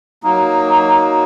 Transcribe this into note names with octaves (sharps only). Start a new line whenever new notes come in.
F#3 A#3 D#4